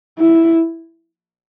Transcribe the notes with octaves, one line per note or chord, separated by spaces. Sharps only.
E4